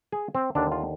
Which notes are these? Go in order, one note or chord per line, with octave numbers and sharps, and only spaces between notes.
G#4
C4
D#2 D3 D4
F4